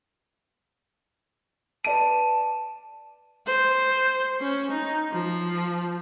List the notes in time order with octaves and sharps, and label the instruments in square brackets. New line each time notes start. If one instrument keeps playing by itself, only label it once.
[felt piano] B4 D5 D#7 [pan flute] A5
[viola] C5
C#4
D#4
F3